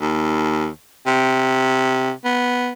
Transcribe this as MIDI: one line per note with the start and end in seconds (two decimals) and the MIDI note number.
0.01 0.68 39
1.06 2.12 48
2.25 2.70 59